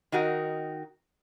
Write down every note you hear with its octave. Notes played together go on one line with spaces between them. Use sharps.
D#3 D#4 F#4 A#4